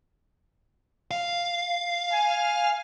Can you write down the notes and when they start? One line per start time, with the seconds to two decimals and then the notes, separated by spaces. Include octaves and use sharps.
1.11 F5
2.12 G#5